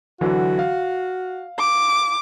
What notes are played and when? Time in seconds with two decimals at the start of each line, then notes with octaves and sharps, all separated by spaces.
0.21 D3 E3 F#3 F#4
0.59 F5
1.59 D6